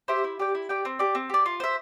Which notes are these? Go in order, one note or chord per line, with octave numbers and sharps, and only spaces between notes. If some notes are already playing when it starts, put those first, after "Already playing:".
G4 C5 E5
E4
G4 D5 G5
E4
G4 D5 G5
C4
G4 D5
C4
G4 D5
F4
C5 E5